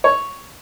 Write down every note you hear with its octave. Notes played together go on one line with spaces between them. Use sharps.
C#5